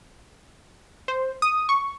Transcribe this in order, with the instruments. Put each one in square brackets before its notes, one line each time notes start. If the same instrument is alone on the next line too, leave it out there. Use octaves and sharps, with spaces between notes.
[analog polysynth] C5
D#6
C#6